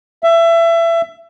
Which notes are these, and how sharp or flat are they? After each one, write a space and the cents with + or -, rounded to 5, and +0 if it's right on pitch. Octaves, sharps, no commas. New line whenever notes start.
E5 +25